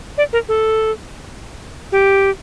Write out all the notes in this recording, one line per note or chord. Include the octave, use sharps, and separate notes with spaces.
D5
A#4
A4
G4